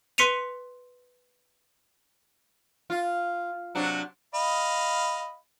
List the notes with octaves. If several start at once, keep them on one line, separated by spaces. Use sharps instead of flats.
B4 C6 B6 C#7 D#7 F7
F4
C3 F#3 D4
D#5 F5 B5